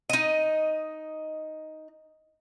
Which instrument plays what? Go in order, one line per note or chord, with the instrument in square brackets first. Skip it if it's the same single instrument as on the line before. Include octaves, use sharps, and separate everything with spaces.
[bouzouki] D#4 D#5